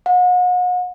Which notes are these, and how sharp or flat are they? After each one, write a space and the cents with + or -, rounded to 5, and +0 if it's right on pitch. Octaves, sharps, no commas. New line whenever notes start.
F#5 -40